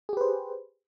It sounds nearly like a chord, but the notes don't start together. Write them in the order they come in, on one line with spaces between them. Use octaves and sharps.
G#4 G4 B4 C5